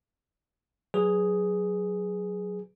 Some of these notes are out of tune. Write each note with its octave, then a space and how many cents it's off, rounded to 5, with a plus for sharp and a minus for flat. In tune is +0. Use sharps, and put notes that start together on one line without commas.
F#3 +0 G#4 +0 B4 +0